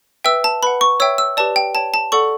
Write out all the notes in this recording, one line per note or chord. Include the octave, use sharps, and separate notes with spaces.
B4 E5 G5 E6
A5
B4 F#5 B5
C#6
C#5 E5 G5 E6
E6
G4 B4 D5 A5
G5
C#5 G5 A5
A5
A4 D5 F#5 C#6